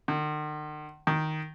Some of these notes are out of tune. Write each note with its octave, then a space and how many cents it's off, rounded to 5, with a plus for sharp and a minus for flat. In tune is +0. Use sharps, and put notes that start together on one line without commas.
D#3 -45
D#3 +0